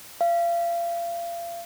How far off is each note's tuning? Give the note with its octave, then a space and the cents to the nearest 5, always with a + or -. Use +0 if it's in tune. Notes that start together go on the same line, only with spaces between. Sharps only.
F5 -35